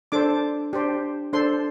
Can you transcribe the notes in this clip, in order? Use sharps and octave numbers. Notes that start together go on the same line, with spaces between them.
D4 A4 C5 D6
D4 G4 C5
D4 A4 C5 C6